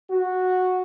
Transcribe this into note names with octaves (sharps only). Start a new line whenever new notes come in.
F#4